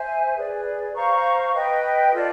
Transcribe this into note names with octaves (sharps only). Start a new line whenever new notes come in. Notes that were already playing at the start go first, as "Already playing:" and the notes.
Already playing: C5 E5 G#5
G#4 B4 D5
C5 F5 A#5 C#6
B4 D#5 G5
F4 A4 D5